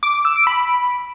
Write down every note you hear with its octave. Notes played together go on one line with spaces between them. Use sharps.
D6
D6
E6
D7
B5